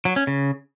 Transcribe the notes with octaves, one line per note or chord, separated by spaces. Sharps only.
F#3
C#4
C#3